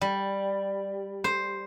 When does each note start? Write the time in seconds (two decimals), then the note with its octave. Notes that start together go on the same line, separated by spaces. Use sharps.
0.01 G3
1.24 C5